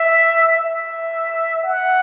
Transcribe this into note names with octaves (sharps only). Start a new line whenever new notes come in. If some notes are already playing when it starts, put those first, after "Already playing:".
Already playing: E5
E5
F#5